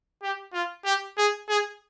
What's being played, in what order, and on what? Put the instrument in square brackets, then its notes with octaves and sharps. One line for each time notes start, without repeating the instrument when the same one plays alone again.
[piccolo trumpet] G4
F4
G4
G#4
G#4